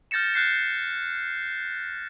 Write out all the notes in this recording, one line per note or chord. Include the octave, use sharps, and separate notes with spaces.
F6 G6 A6 A#6 C#7 E7
F#6 G6 C7 C#7